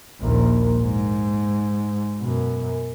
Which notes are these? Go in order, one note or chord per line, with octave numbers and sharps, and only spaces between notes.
A#1 D#2
G#2
F#2 B2